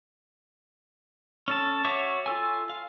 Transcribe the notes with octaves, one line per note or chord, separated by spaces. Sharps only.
C#4 A4 A5
F#4 C#5 E5 C#6 D6
F4 A4 G#5
F5